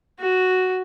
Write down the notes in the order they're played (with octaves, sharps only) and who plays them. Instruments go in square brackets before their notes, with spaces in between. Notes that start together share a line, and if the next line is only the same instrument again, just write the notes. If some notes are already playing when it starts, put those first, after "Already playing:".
[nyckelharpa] F#4